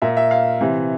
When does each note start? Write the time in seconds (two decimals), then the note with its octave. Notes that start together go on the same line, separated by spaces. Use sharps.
0.02 A#2 E5
0.17 E5
0.31 F5
0.61 C3 E3